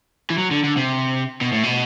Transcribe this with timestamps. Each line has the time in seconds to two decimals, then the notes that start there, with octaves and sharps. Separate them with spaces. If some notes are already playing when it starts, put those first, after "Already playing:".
0.30 E3
0.38 F#3
0.51 D3
0.64 D3
0.77 C3
1.41 B2
1.52 A2
1.63 B2